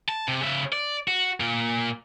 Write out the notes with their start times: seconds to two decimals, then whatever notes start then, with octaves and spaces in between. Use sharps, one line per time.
0.09 A5
0.28 C3
0.42 C#3 E5
0.73 D5
1.08 F#4
1.40 A#2 A#3